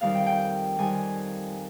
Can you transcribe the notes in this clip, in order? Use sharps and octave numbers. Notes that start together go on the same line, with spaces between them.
F2 D#3 G3 F5
G5
G5
F2 D#3 G3 G#5